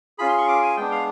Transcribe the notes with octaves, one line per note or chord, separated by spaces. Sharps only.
C#4 F4 G#4 B5
C6
C#6
D6
G#5
G#3 B3 D4 G5
F5